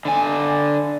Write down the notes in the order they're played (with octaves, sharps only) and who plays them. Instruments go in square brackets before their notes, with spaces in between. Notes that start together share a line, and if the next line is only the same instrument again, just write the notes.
[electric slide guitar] D3 G#5